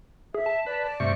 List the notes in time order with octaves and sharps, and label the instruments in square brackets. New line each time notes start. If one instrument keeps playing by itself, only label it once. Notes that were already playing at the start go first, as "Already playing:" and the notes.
[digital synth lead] G#4 [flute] E5
[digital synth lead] A5
[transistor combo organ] B4 [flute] D5
[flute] D5
[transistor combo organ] G2 C3 C#6 [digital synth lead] A3